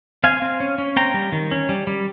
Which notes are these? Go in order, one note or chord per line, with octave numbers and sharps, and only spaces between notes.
C4 F5 G#5
C4
C#4
C#4
C4 G5 A#5
G3
D#3
C#4
G3
G3